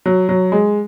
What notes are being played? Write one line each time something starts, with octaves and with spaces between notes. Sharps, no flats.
F#3
F#3
G#3